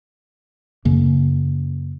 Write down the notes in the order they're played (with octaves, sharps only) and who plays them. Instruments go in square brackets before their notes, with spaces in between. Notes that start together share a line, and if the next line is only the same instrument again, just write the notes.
[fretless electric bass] F#2 C#3 A#3